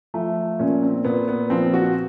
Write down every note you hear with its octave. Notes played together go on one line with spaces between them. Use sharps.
F3 A3
A#2 C#4
C4
A#2 B3
B3
F3 C4
F#4